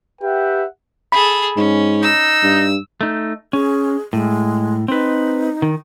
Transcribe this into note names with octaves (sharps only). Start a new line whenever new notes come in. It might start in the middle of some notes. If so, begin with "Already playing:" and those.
G4 B4 E5 F#5 G5
G#4 A4 B5
G#2 C#4
D#4 E6
G2
A3 D#4
C#4 G#4
A2 G#3
C4 D#4 B4
D#3